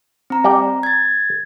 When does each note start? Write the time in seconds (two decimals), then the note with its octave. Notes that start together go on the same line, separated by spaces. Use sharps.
0.30 C4 A#5
0.44 G3 D5 G5
0.83 G#6 A6